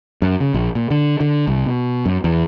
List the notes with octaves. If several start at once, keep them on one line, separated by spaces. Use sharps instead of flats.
F#2
C#3
A#1
A#2
D3
D3
C2
B2
F#2
E2